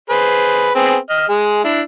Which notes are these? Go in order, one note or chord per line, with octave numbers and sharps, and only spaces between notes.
G#4 B4 C5
B3 C4 G#4
D#5 F6
G#3 G#4
D4 E4